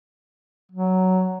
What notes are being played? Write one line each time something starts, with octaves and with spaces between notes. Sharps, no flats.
F#3